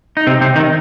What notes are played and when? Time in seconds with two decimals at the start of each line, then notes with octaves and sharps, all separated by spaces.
0.17 D#4
0.27 C3 C4
0.41 C3 C4
0.56 D#3 D#4